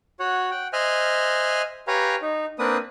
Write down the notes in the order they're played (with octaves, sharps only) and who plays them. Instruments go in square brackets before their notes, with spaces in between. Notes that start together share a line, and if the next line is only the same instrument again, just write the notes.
[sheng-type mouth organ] F#4 C#5 F#5
F#5 G5
C5 D#5 E5 G#5 F6 F#6
G4 B4 C#5 F5 G#5 A#5
D#4
A#3 C4 D4 B4 D#6